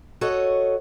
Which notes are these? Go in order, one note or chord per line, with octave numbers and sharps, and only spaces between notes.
F#4 A4 C#5 D#5